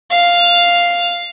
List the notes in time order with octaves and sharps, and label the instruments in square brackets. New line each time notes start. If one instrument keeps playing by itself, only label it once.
[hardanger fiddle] F5